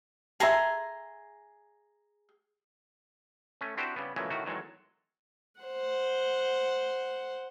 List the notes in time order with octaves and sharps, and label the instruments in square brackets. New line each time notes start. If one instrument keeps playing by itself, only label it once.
[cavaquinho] G#4 A#5 C6 [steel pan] E5 A5
[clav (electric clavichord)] A3 C#4
C4 D4 E4 F#4 G4 C5
C#3 G3 B3
A#2 C#3 E3 F#3 G#3 A3
A2 D#3 A3 F#4
E2 D#3 F#3 G#3 A4
[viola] C5 F#5